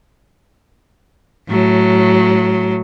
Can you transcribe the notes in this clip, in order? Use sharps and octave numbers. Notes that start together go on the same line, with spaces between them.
A2 F#3